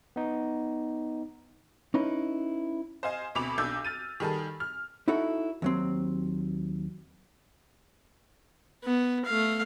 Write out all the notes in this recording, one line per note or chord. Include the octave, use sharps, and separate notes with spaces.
B3 D#4
C#4 D#4 E4 B4
C5 D#5 F5 G#5
D2 B2 C4 B5 D6 F7
B1 D4 D6 E6 G6
F6 A6 D#7
D#3 G3 G#4 A4
F6
D#4 E4 F#4 A4 C#5
D#2 F#3 C4
B3
A3 F5